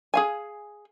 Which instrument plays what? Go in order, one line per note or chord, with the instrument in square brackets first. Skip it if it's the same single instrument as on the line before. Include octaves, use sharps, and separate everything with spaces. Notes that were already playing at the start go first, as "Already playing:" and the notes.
[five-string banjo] G#4 F5 G#5